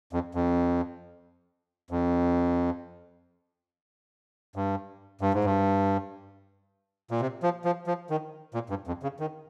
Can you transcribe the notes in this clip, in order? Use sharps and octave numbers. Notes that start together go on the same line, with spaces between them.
F2
F2
F2
G2
G2
G#2
G2
A#2
C3
F3
F3
F3
D#3
A#2
G2
F2
C#3
D#3